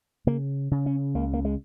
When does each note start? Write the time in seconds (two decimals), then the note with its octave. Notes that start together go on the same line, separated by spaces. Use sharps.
0.27 C#3 A#3
0.71 C#3
0.86 C#4
1.15 C#2 A#3
1.33 A#3
1.45 G#3